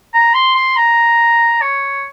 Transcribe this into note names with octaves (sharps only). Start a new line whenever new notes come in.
A#5
C6
C6
A#5
C#5